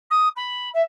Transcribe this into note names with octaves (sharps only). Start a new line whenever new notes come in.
D#6
B5
E5